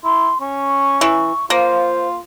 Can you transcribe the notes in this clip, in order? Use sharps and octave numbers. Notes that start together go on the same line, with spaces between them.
E4 C6
C#4 C#6
E3
A#3 F4 C5